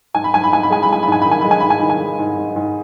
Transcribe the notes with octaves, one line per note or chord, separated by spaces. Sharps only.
G#2 G#5
B5
G#2 G#5
B5
G#2 G#5
B5
G#3 G#5
B5
G#3 G#5
G#2 B5
G#5
D#3 B5
G#5
G#3 B5
G#5
G#2 B5
G#5
D#3 B5
G#5
G#3
G#2
G#2
G#2